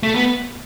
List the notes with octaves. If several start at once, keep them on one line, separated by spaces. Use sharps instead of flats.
A3
B3